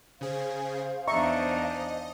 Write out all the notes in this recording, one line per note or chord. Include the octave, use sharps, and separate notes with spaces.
C#3 G#4 C5 F5
E2 D4 D#4 D#5 E5 A#5 C#6